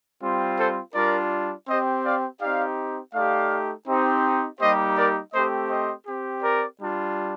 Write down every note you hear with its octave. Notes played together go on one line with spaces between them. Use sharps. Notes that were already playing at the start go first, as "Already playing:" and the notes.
G3 C4 F4
A4 C5
G3 D4 F4 A#4 D5
C4 G4 C5 D#5
D5 F5
C4 D#4 G4 D5 F5
A3 D#4 G4 D5 F5
C4 D#4 G4
G3 A#3 D#4 G4 C5 D#5
A#4 D5
A3 C4 G4 C5 D#5
C5 D#5
C4 G4
A#4 D5
G3 D4 F4